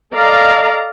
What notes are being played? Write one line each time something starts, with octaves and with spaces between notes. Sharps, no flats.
A4 D5 D#5 F5 A#5